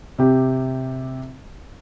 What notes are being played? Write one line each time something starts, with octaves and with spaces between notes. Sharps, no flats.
C3 G4